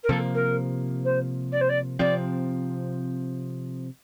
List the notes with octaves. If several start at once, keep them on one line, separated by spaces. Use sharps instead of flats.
A#4
C3 F3 A#3 A4
A#4
C5
D5
C5
D5
C3 F3 C4 D5